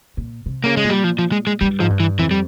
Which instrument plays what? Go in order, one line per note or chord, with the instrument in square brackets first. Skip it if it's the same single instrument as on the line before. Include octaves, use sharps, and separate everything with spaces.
[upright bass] A#2
C3
[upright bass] C#3 [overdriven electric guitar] A#3
[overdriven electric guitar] G#3
[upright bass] A#2
[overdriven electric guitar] G3
F3
F3
G#3
G#3
[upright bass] G2 [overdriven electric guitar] G3
[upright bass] G#2 [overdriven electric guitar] F3
[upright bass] G2
[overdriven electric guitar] E3
[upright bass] F2 [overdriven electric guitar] E3
[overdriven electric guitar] G3